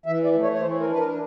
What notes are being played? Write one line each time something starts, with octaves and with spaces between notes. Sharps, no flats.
E3 E5
D5
A3
C#5
C#5
E3 C5
A#4
D4 B4
A#4